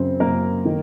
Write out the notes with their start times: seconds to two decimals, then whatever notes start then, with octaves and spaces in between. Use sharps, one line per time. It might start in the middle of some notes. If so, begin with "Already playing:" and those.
Already playing: F#2 C#3 C4
0.20 F#2 C#3 A#3 A#4
0.65 D#3